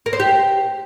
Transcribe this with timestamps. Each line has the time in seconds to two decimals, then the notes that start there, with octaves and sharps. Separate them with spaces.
0.06 A#4
0.13 C5
0.20 G4